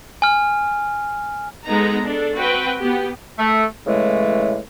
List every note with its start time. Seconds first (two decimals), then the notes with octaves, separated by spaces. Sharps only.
0.22 G#5 F6
1.66 G#3 B3 D#4 A4 A#5
2.03 D4 A4
2.37 C4 F#4 B4 G5
2.81 B3 G4
3.39 A3
3.86 A2 C#3 E3 G#3 A3